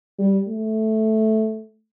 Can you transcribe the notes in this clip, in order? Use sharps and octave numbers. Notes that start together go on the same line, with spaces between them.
G3
A3